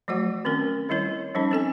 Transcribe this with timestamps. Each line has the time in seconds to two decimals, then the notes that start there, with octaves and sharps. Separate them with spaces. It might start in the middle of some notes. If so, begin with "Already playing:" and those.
0.08 F3 F#3 A3 F#4 F#5
0.45 D#3 C4 C#4 A#4
0.89 D#3 G3 E4 C#5
1.35 F3 G3 C#4 D#4
1.51 C4 A4 G#5